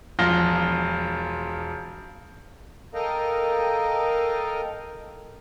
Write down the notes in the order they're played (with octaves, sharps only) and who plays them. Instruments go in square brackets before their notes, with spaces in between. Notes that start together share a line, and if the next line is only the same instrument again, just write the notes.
[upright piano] E1 F3 F4 A#6 G7
[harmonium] A4 A#4 D#5 F5 G5 A#5